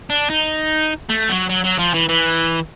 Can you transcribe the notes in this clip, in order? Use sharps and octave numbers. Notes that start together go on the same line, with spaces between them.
D4
D#4
A3
F#3
F#3
F#3
F3
E3
E3